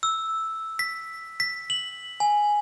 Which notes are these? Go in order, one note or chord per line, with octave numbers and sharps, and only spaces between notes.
E6
B6
B6
F#7
G#5